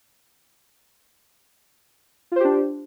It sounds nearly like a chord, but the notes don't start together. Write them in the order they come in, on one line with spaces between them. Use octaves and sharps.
F4 C5 G4 D4